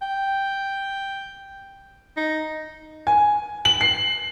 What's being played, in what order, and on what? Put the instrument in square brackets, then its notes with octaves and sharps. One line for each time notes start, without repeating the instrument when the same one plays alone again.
[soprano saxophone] G5
D#4
[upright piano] G#5
F#7
C7